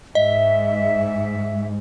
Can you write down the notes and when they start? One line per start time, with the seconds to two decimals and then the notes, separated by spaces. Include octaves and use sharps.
0.15 G#2 D#5 E5